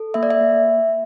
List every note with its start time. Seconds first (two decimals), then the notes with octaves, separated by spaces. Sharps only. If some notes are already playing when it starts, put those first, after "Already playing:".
Already playing: A4
0.14 A#3 E5
0.23 D5
0.31 E5
0.40 A#3